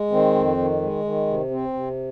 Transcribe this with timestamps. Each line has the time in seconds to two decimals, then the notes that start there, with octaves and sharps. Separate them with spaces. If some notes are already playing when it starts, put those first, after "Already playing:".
Already playing: G#3
0.11 D#3 C4
0.34 F2
0.57 D#3
0.81 G#3
1.04 D#3
1.27 C3
1.51 C4
1.74 C3